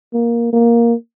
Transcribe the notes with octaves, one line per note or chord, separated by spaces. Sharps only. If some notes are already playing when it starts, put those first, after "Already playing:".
A#3
A#3